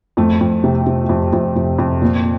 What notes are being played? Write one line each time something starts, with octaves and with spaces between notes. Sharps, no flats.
F2 A3
F2
C3
C3
F2
F2
F2
F2
A#2